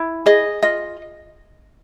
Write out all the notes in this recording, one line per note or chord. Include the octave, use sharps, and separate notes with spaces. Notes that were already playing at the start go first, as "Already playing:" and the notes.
Already playing: E4
G#4 D#5
F4 D#5